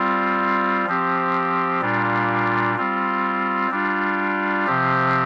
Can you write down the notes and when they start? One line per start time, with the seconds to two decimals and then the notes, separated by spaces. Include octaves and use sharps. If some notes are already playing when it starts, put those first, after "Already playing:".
Already playing: G3 C4 F4
0.86 F3 C4 G4
1.81 A#2 G3 D4 F4
2.76 G3 C4 F4
3.71 G3 D4 F4
4.66 C3 F3 C4 G4